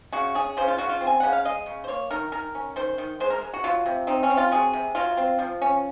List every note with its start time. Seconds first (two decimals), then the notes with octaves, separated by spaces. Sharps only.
0.13 C#3 F#4
0.34 C#4 G#4
0.57 C#3 C5
0.67 F4
0.78 C#3 F#4
0.89 F4
1.01 C4
1.07 G#5
1.20 C#3 F#5
1.32 F5
1.45 G#3 D#5
1.66 C#3
1.84 C5
1.88 A#3 C#5
2.11 D#3 A#4
2.32 D#3 A#4
2.55 C#4
2.76 D#3 C5
2.98 D#3
3.20 G#3 C5
3.30 A#4
3.41 G#3
3.54 F#4
3.64 F#3 F4
3.86 C3
4.07 C4 D#4
4.23 C#4
4.30 C4
4.37 F4
4.52 F#3 G#4
4.73 C3
4.95 F#3 F4
5.17 C4
5.39 F3
5.62 C#4